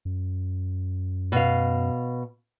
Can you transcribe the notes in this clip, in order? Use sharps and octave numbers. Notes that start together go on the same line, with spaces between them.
F#2
B2 F5